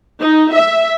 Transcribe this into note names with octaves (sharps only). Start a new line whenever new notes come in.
D#4
E5